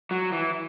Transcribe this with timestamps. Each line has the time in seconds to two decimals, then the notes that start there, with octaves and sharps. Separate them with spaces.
0.11 F#3
0.32 E3